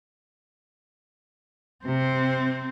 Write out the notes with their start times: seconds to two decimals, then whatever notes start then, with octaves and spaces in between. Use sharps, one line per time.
1.85 C3 C4